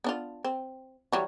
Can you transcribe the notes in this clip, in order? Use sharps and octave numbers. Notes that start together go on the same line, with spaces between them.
B3 D4 F4
C4
E3 F#3 G3